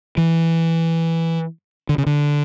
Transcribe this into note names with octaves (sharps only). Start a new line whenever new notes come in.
E3
D3
C#3
D3